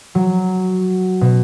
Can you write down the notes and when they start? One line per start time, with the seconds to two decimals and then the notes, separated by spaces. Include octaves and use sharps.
0.15 F#3
1.21 B2